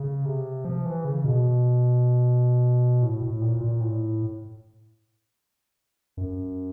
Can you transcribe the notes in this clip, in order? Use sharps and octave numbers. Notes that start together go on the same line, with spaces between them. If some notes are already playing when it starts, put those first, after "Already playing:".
Already playing: C#3
C3
F3
E3
C#3
B2
A2
A2
A#2
A#2
A2
F#2